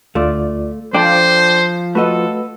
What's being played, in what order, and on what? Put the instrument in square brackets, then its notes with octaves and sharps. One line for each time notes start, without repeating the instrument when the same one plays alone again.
[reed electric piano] D2 F4 D5 [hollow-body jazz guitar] A3
[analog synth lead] F3 [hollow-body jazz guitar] D4 A4 [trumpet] C5 [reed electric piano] G5 D6
[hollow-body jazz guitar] A3 F#4 D#5 [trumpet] A4 [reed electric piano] B4